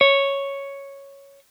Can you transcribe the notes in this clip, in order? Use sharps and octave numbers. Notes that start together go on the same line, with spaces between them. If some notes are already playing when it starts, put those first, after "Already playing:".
C#5